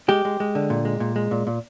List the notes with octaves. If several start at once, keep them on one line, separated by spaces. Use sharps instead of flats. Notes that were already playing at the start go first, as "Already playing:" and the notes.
G#3 G4
G#3
G#3
D3
A#2
G#3
A#2
G#3
A#2
A#2